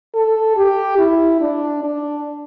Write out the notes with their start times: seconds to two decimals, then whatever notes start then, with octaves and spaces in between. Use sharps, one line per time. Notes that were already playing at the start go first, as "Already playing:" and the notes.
0.15 A4
0.57 G4
0.98 E4
1.41 D4
1.84 D4